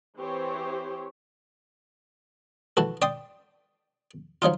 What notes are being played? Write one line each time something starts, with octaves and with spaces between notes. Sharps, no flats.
E3 C4 G4 C5 C#5
E3 F#4 A4
D5 G5 C6 D#6
F3 F#3 D#4 F4